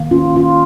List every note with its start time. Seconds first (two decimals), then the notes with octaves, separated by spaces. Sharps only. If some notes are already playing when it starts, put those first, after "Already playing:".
Already playing: D#3 A#3
0.11 C#4 F4
0.36 C#4 F4